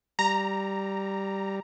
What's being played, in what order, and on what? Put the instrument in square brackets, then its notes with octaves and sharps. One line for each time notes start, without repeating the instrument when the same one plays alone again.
[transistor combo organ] G3 [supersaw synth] A#5